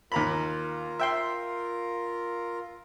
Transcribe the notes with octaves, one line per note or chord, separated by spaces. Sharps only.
D#2 F4 A#4 A#5 B5
E5 G5 C6